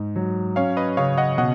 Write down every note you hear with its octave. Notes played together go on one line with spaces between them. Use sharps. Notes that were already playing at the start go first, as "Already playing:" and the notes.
Already playing: G#2
F#3
C#4 C#5 F5
B4 D#5
C#3 C#5 F5
D#5 F#5
B2 D#5 F#5